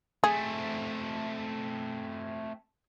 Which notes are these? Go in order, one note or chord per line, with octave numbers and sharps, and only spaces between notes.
A3 C4 G#4